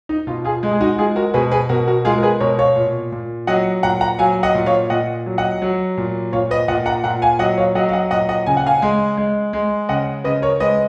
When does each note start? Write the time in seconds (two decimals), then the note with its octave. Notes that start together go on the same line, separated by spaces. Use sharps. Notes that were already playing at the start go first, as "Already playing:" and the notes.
0.09 D#4
0.27 B2 F4
0.45 F4 G#4
0.63 G#3
0.71 G#4
0.81 D#4 F#4
0.98 G#3 F4 G#4
1.16 F#4 A#4
1.34 B2 G#4 B4
1.51 G#4 B4
1.69 B2 F#4 A#4
1.87 F#4 A#4
2.05 G#3 F4 G#4
2.18 A#4
2.23 G#4 B4
2.40 B2 A#4 C#5
2.59 C#5 F5
2.76 A#2
3.12 A#2
3.47 F#3 D#5 F#5
3.83 A#2 F#5 A#5
4.01 F#5 A#5
4.19 F#3 F5 G#5
4.43 D#5 F#5
4.54 A#2
4.66 C#5 F5
4.90 A#2 D#5 F#5
5.26 F#3
5.38 D#5 F#5
5.62 F#3
5.97 A#2
6.33 A#2 C#5 F5
6.51 B4 D#5
6.68 A#2 D#5 F#5
6.86 F#5 A#5
7.04 A#2 F#5 A#5
7.22 F5 G#5
7.39 F#3 D#5 F#5
7.58 C#5 F5
7.75 F#3 D#5 F#5
7.89 F5
7.93 D#5 F#5
8.11 A#2 D#5 F#5
8.29 D#5 F#5
8.46 C#3 G#5
8.57 F#5
8.66 F5 G#5
8.82 G#3
9.17 G#3
9.53 G#3
9.89 C#3 D#5 F#5
10.24 C#3 B4 D#5
10.42 A#4 C#5
10.60 G#3 B4 D#5